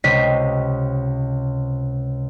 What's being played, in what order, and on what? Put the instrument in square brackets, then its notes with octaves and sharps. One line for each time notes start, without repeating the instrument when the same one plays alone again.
[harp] C#2 C3 G4 D#5 B6 C7